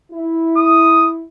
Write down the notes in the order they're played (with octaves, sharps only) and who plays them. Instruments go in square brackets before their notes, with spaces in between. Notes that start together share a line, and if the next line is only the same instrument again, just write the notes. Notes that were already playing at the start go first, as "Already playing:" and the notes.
[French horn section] E4
[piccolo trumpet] D#6